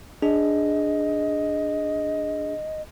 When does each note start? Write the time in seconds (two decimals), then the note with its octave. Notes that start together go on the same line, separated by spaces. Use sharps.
0.22 D4 G#4 D#5